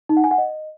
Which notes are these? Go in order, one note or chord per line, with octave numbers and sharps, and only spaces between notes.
D#4
F#5
G#5
F#5
D#5